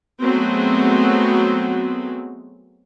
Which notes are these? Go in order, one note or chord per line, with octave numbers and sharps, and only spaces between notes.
F#3 G#3 A3 B3 C4 F#4